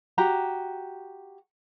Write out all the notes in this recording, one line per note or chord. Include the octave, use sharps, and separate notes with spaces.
F#4 G4 A#5